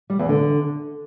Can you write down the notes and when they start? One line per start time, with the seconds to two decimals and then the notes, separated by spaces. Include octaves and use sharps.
0.10 G3
0.19 E2
0.29 D3